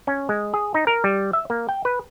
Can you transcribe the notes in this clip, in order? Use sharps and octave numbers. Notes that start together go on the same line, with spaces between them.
C#4
G#3
G#4
D#4
A#4
G3
E5
A#3
G5
B4